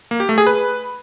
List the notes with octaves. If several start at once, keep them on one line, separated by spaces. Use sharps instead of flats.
A#3
G4
A3
G#4
B4